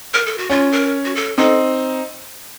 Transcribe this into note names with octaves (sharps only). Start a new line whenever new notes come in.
A#4
A4
F#4
C#4 F4
A#4
F#4
A4
C4 D#4 A4